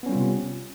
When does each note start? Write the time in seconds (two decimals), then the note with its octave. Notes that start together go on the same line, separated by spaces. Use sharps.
0.03 B3
0.06 C#4
0.09 G3
0.12 F4
0.15 C3